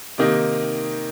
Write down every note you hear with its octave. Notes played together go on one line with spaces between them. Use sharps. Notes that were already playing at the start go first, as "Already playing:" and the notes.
C3 D#3 A#3 D#4